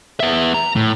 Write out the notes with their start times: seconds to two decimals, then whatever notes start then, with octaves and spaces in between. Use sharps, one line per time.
0.20 B3 E5
0.54 A#5
0.76 A2